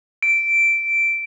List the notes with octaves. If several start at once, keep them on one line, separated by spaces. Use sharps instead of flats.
D7